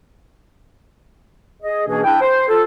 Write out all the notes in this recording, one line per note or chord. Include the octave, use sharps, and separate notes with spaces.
G#4 D#5
B2 E3 A#3 C#4 D4 G#4
D4 E4 G5
C5
F4 A4